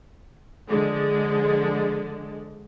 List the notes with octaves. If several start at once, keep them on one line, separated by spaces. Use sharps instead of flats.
D3 F3 G#3